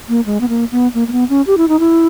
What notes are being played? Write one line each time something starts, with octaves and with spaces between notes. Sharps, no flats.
A#3
G#3
B3
A#3
B3
A#3
A#3
B3
C#4
G4
E4
D#4
E4